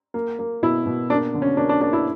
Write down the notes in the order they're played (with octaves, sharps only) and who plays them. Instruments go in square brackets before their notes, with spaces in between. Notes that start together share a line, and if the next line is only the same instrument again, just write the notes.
[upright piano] A#3
A#3
B2 E4
B2
A#3 D4
D3
C#4
A#3 D4
D4
A#3 D4
E4